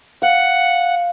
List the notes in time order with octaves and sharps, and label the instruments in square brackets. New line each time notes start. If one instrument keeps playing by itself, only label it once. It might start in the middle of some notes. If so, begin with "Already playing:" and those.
[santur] F5 [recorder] F#5